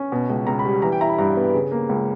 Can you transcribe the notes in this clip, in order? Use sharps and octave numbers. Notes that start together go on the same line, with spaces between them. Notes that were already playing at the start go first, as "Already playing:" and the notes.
Already playing: C#4
B2
C#2
C#2 A#5
B5
G3
E3 A#5
G5
E4 A#5
B5
G2 A#5
B3
C#3
A#3
C#2